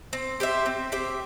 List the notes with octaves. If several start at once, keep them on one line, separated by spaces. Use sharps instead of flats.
C4
G4 C5 E5
C4
G4 C5 E5